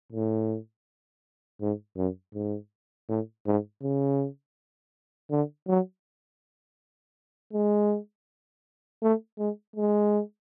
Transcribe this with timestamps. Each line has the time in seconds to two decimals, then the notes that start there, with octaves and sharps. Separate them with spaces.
0.12 A2
1.61 G#2
1.97 F#2
2.34 G#2
3.09 A2
3.46 G#2
3.82 C#3
5.31 D3
5.68 F#3
7.53 G#3
9.02 A3
9.39 G#3
9.76 G#3